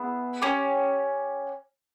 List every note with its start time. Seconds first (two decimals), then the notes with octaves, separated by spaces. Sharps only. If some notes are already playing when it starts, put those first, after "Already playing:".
Already playing: B3 E4 G#4
0.42 C#4 G4